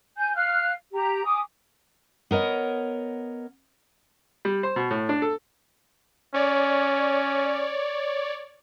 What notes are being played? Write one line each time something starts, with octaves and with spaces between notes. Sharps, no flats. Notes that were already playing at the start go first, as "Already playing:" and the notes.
G#5 G6
F5 F6 F#6
G4 A#5
G#5 D6 D#6
B3 A#4 C#5 D#5
G3
C5
B2
A2
D4
A4
C#4 C#5 D5